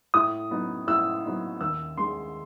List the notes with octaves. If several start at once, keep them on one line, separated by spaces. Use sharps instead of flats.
A2 D#6
F#3 B3 D#4
A2 E6
F#3 B3 D#4
D#2 E6
D#3 G#3 C6